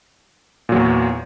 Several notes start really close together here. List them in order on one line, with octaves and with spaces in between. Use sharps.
A#2 F#3 E2